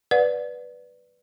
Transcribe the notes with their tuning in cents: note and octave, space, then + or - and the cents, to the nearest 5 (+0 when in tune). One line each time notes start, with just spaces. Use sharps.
B4 +0 D5 +0 F#5 -30